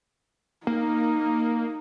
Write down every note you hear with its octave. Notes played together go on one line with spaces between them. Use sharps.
A#3 D#4